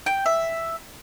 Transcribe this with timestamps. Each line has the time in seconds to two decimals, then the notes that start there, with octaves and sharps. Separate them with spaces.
0.06 G5
0.26 E5